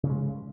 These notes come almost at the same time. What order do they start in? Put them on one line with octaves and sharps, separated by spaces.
C#3 C#4 G#3